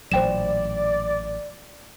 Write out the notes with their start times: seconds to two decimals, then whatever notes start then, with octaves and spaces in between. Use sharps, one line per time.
0.12 A1 A#2 F#3 C5 D5 G5 E7